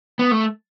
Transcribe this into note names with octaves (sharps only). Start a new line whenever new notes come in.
B3
A3